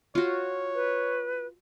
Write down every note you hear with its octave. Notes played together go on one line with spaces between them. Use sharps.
F4 F#4 C#5
B4